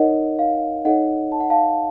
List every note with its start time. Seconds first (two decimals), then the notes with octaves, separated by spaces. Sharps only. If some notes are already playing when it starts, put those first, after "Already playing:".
Already playing: D#4 A#4 C#5 D#5 F#5
0.39 F5
0.85 D#4 A4 C#5 D#5 F#5
1.32 A5
1.40 F#5
1.50 F5 A5